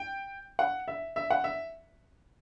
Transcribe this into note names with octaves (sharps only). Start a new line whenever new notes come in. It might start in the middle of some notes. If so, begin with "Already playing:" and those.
Already playing: G5
F#5
E5
E5
F#5
E5